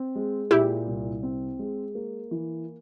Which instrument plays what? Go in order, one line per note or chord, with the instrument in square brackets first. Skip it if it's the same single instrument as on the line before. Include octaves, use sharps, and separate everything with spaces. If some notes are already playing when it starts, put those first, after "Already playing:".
Already playing: [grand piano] C4
G#3
[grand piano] A#2 [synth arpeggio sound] E4 G4
[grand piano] C2
C4
G#3
A#3
E3